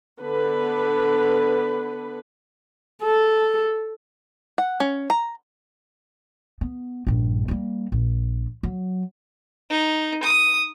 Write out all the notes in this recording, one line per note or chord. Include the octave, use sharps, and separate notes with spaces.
D3 B3 B4
A4
F#5
C#4
A#5
B3
A#1 G2
G3 A#3
A#1
F#3
D#4
D#6